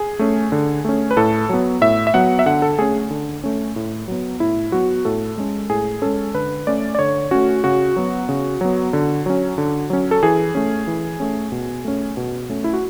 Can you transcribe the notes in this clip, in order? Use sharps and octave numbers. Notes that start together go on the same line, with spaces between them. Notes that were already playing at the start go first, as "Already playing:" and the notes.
Already playing: G#4
A3 C#4
D3
A3 C#4
B4
A2 A4
F#3 B3
A2 E5
E5
F#3 B3 F#5
E5
D3 F#5
A4
A3 C#4 G#4
D3
A3 C#4
A2
F#3 B3
A2 E4
F#3 B3 F#4
A2 A4
G#3 C#4
A2 G#4
G#3 C#4 A4
D3 B4
A3 C#4 D5
D5
D3 C#5
A3 C#4 F#4
C#3 F#4
F#3 B3
C#3
F#3 B3
D3
F#3 C#4
D3
F#3 C#4
A4
E3 G#4
A3 C#4
E3
A3 C#4
B2
A3 C#4
B2
A3 C#4
E4
F#4